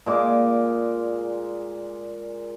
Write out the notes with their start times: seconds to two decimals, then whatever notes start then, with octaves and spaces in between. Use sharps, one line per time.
0.06 A#2 G#3 D5 D6